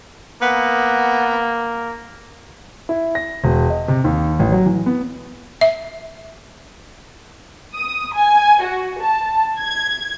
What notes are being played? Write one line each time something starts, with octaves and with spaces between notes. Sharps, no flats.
A#3 B3
E4
A#6
E1
D#5
C3
D#2
A1
F#3
E3
B3
E5
D#6
G#5
F#4
A5
G#6